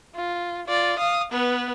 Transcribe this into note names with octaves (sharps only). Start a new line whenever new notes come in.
F4
F4 D5
F5 D#6
B3 B4